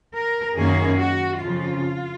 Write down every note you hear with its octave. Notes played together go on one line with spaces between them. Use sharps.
A#4
F#2 D#3 A#3 C#4 G#4
F#4
F2 C#3 F3 F4